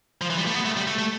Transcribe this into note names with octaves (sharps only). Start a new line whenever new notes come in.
F3
E3
G3
A3
B3
A3
G3
A3
A3